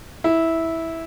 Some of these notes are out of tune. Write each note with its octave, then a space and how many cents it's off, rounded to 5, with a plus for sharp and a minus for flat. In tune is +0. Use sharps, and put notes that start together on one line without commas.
E4 -10